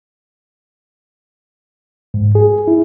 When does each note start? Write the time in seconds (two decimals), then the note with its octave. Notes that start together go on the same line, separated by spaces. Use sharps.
2.14 G#2
2.35 G#4
2.68 E4